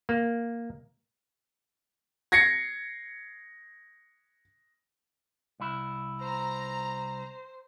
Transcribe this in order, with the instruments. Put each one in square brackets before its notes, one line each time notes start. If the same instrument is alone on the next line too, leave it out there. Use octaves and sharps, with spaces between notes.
[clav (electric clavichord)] A#3
[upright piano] G#6 A#6 C7 C#7
[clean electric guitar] C2 E4
[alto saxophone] C5 [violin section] A#5